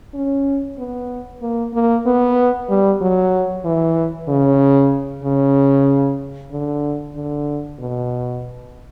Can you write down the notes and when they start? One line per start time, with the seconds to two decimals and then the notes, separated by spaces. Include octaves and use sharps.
0.14 C#4
0.78 B3
1.42 A#3
1.74 A#3
2.06 B3
2.69 G3
3.01 F#3
3.65 E3
4.28 C#3
5.24 C#3
6.51 D3
7.15 D3
7.79 B2